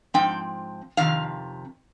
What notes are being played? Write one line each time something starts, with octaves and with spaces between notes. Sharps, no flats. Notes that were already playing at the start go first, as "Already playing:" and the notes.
G#2 F3 C4 G5
F2 C3 D#3 F5